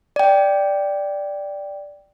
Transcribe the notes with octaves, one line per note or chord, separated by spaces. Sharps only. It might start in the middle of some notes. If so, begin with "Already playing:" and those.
D5 G5